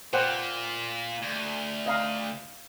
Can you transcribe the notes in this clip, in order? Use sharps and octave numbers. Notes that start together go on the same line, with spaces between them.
A#2 C5 F#5 G5
D2
D#5 F5 A#5